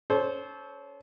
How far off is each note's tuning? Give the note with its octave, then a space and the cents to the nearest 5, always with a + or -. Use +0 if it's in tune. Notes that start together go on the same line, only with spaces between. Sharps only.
C#4 +20 A4 -25 C5 +0